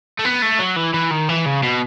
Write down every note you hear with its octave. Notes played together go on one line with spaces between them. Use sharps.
A3
B3
A3
F#3
E3
E3
D#3
E3
C#3
B2